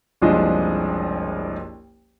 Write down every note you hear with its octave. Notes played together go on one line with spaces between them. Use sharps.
F#1 C2 F3 G#3 D4 D#5